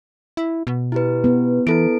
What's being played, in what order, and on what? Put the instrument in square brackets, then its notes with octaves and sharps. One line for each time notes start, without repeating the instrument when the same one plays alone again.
[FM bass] E4
B2
[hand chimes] E4 G4 B4
[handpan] B3
[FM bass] E3 [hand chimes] E4 A4 D7